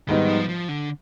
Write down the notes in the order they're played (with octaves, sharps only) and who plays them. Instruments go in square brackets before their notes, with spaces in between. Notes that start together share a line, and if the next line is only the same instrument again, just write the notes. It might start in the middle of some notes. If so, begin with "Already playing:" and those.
[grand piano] G#2 G3 B3 D#4 [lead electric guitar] D#3
[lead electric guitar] F3
F3
D3